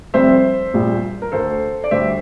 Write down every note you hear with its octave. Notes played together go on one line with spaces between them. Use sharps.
F1 F2 C3 G3 C5 E5
A#1 A#2 G3
A#4
D2 D3 A3 A4 C5
D5
D2 D3 G3 C5 E5